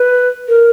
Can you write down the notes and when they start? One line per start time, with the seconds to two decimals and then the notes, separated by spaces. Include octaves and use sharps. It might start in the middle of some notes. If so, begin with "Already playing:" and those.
Already playing: B4
0.48 A#4